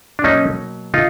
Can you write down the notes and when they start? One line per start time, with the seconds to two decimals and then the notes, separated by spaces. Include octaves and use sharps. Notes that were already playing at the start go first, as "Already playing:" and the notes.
0.19 D4
0.24 B2 F#3 A#3 C#4 D#4
0.94 D3 D#4 F4